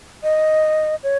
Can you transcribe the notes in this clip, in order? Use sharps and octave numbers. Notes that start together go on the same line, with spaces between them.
D#5
C#5